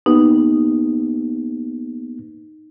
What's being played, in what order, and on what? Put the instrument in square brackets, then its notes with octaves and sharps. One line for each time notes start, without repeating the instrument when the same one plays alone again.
[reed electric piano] A#3 B3 G4 [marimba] D#4